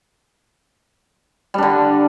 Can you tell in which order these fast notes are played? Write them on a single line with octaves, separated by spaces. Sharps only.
G3 D4 D3